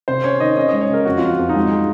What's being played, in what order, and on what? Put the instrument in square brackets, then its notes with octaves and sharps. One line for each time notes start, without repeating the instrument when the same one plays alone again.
[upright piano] C3 [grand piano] C5
[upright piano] C#4 [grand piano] C#5
[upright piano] D#3 [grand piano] D#5
[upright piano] C#4 [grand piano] D#5
[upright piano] G#3 [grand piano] D#5
[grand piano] C#5
[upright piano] C#3 [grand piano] A#4
[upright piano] F2 [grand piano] F#4
[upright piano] F2 [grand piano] F4
[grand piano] F#4
[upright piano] F2
[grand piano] D#4
[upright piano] G#3 [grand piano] F4
[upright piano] G#3